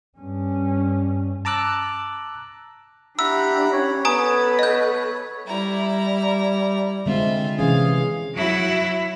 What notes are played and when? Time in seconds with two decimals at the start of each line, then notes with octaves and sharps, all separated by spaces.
0.18 G2 C#4
1.45 A5 A#5 D6 E6 F#6
3.19 D4 E4 G4 F#5 A#5 B5 E6
3.73 C#4 C#5
4.05 B3 A4 B4 G#5 A#5 D#6
4.59 D#5 G6
5.47 G3 E4 A#5
7.06 D3 G#3 C4 F4 E5
7.59 C3 E3 C#4 G#4 F5
8.34 F#3 E4